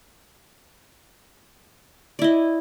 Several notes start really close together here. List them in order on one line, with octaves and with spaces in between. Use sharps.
D5 E4 D#5